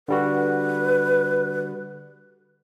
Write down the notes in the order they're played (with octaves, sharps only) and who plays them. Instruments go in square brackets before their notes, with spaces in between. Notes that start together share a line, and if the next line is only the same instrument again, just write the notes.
[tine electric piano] D3 G3 F#4 [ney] B4